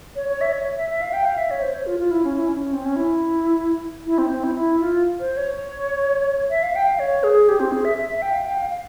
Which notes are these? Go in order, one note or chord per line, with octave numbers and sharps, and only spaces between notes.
C#5
C#5
E5
C#5
E5
E5
F5
G5
F5
E5
C#5
C5
C#5
F4
F4
E4
C#4
E4
C#4
C#4
C4
C#4
E4
E4
C4
C4
E4
E4
F4
C5
C#5
E5
F5
G5
F5
C#5
G#4
G4
C4
G#4
E5
E5
E5
G5
F5
G5
F5
F5